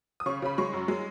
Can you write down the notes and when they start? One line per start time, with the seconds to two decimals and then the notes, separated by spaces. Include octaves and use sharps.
0.20 D#6
0.26 C#3 C#6
0.42 C#3 B5
0.58 G#3 C#6
0.73 F#2
0.88 G#3